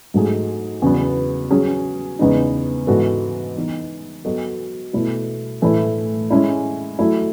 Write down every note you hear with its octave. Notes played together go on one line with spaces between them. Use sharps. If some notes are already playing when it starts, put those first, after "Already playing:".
G#2 F#3 A3 D#4 G#4
E2 C#3 F#3 B3
F#3 C#4 G#4
E2 C#3 G#3 B3 D#4
G#2 E3 B3 F#4 A4
E3 B3 D#4
F#3 B3 F#4 A4 D#5
B2 A3 E4 A4
A2 E3 A3 E4
G#3 C#4 E4
F#3 A3 E4